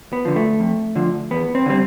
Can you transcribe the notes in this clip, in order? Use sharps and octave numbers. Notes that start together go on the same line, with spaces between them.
B3
D3 F3
A3
F2
D3 F3
E2 B3
C4
D3 G3 C4